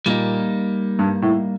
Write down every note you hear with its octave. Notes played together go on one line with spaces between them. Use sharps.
A#2 G3 A#3 D#4
G2
A2